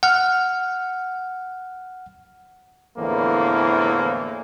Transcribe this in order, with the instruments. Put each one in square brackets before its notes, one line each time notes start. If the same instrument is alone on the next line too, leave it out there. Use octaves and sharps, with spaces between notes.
[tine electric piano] F#5 F6
[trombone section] E2 A2 D3 E3 F3 A#3